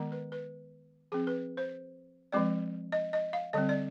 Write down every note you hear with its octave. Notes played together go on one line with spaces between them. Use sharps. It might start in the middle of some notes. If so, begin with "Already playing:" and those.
Already playing: D#3 G#3 B3
B4
B4
F3 C4 G#4
B4
C5
F3 G#3 C4 D5
D#5
D#5
F5
D3 G3 C4 D#5
D5